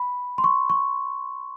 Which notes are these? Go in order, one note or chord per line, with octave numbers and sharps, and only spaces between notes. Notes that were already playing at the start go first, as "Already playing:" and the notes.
Already playing: B5
C6
C#6
C#6